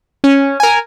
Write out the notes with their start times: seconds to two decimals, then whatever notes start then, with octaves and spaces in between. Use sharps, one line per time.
0.24 C#4
0.60 A#4 G#5